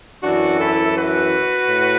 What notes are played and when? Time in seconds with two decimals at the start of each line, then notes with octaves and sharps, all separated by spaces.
0.23 F#2 E3 D4 F#4
0.59 E4 A4
0.95 F#4 B4
1.68 A2